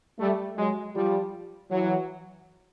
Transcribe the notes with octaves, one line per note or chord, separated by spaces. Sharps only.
G3 A3
F#3 G#3
F3 G3
E3 F#3